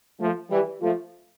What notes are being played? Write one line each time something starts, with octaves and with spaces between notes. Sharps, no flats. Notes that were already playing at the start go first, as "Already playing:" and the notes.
F3 A3
E3 G3
F3 A3